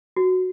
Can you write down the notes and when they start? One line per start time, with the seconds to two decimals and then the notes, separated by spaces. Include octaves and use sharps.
0.16 F#4